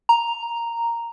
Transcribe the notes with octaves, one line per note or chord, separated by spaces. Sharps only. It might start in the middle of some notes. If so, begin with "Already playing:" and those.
A#5